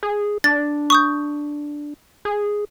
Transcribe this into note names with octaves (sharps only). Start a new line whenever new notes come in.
G#4
D4 A6
C#6 D#6 G6
G#4